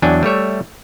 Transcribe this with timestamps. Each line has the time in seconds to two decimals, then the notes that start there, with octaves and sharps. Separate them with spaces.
0.02 E2 F#3 D4 G5 G#5
0.23 G3 A3 C#5 E5